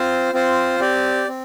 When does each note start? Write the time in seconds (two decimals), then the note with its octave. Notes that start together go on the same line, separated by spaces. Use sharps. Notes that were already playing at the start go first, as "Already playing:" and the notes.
Already playing: C4 F4 C5
0.33 C4 F4 C5
0.80 C4 G4 D5
1.28 C4